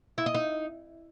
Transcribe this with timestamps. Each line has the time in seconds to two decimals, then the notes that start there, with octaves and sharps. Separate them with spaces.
0.18 E4
0.26 D#5
0.34 D#4